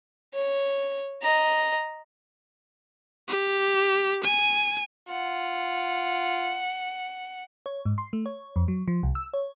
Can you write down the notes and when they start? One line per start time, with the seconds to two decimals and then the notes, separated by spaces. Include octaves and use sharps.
0.34 C#5
1.22 D#5 A#5
3.28 G4
4.24 G#5
5.08 F4 F#5
7.66 C#5
7.85 G#2
7.98 C6
8.13 A3
8.26 C#5
8.56 F2
8.68 F#3
8.88 F3
9.03 C2
9.15 E6
9.33 C#5